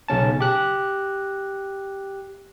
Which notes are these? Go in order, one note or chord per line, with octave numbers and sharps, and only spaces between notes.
B1 C#3 C#4 A5
G4 F#6